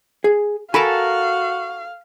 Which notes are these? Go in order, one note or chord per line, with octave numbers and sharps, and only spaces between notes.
G#4
F#4 A4 A#4 F5 G#5 A5 B5